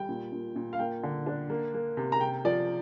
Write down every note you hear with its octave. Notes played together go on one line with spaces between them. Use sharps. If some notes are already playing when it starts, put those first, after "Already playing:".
Already playing: G3 G5
A#2
A#2
A#2
F5
A#3 G5
D3
D4
A#3
A#3
C3
A#5
C3 G5
F3 D5